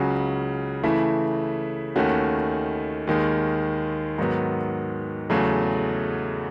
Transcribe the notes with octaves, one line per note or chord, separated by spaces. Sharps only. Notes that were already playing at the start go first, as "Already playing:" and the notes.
Already playing: C#2 C#3 F#3 C#4 F#4
C#3 E3 A3 E4
D#2 D#3 A3 C#4 F#4
D#2 D#3 G#3
G#2 D#3 F#3 B3
E2 C#3 F#3 A3